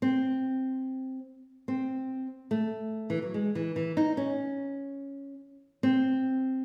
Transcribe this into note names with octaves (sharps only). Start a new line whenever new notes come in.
C4
C4
A3
E3
F#3
G#3
E3
E3
D#4
C#4
C4